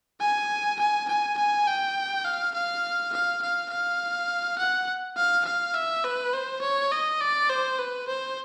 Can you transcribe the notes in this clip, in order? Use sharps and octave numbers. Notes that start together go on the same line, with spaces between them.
G#5
G#5
G#5
G#5
G5
F5
F5
F5
F5
F5
F#5
F5
F5
E5
B4
C5
C#5
D#5
D5
C5
B4
C5